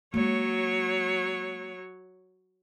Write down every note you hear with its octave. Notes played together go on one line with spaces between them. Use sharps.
F#3 G#3 A#3 C#5